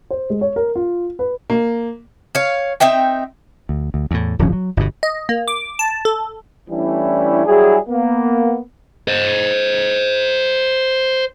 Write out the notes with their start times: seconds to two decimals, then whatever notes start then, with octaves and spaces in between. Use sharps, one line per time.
0.11 C5
0.30 G#3
0.41 C#5
0.56 A#4
0.76 F4
1.19 B4
1.50 A#3
2.35 C#5 F5
2.80 C4 D#4 E5 G5
3.69 D2
3.94 D2
4.11 E2 A2
4.39 D1 G1 F3 C#4
4.53 F#3
4.77 G1 B2
5.03 D#5
5.29 A#3
5.48 D6
5.79 A5
6.05 A4
6.70 E3 G3 A3 C#4 D4 E4
7.46 F#3 G3 E4 G#4
7.88 A#3 B3
9.08 C5 D#5